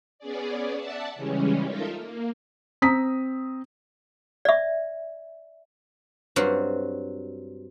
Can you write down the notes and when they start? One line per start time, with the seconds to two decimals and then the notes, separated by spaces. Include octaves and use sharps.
0.19 B3 C#4 G#4 D5
0.76 D5 E5 F#5 A5
1.15 C#3 E3 G3 G#3 C#4
1.65 D#4 F4 A4 A#4 E5
1.96 A#3
2.82 C4 A#5 D#6 B6
4.45 D5 E5
6.36 G2 F#3 C4 F4 F#4